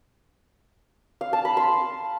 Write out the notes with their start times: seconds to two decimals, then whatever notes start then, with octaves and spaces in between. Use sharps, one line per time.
1.21 F5
1.33 A5
1.45 B5
1.57 C6